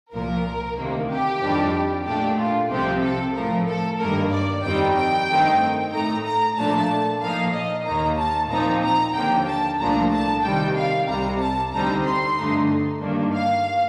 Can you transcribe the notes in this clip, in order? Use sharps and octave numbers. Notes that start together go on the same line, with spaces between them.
C2 A#2 F3 A#4
D2 C3 D#3 A#3
G4
F2 D#3 G3 D4
A#2 A3 D4 G4
F4
C2 C3 F3 C4 G4
A4
A2 F3 A3 A#4
A4
G2 D#3 A#3 A#4
D5
F2 D#3 G3 C4 D#4 G5
G5
G2 D#3 A3 C4 D#4
A2 A3 D#4 A#5
A#5
A#2 F3 A3 D4 A5
A#2 F3 A#3 D#4 F5
D#5
D#2 D#3 A#3 D#4 A#5
A5
A#2 F3 C4 D#4 A#5
A#5
D#2 D3 F3 A#3 G5
A5
C2 A#2 F3 A3 D4 A#5
A5
C3 D#3 G3 G5
F5
C2 C3 G3 A#5
A5
D2 D3 G3 C4 D#4 A#5
C6
G2 D3 A3 D#4
G2 D#3 A#3 D4
F5